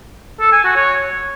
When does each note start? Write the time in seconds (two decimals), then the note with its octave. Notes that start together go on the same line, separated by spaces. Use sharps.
0.40 A4
0.52 G#5
0.64 F#4
0.76 C#5